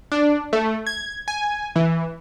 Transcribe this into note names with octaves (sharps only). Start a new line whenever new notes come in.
D4
A3
G#6
G#5
E3